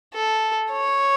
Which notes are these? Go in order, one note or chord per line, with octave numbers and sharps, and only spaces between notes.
A4
C#5